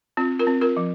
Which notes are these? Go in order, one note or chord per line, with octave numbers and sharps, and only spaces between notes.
C4 F4
F4 A#4
C4
F4 A#4
F3